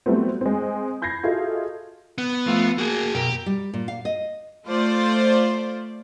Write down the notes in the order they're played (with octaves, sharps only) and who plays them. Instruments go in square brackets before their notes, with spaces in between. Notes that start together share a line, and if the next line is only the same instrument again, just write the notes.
[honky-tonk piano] F#3 G3 A3 B3 C4
G#3 C4
B5 G6 G#6 A#6 C7
F4 F#4 G#4 A4 D#5 E5
[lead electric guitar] B3
[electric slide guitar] F3 A3 F4
[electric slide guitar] A#3 [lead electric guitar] F#4 G#4
[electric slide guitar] F#2 B2 A#4 [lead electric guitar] G4
[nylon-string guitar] G3
A#2
F5
D#5
[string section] A3 F4 C5 D5